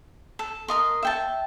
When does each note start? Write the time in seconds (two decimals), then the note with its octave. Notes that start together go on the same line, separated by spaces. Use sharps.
0.39 A4
0.68 A#4 D#5 C6
1.03 E5 G5 A5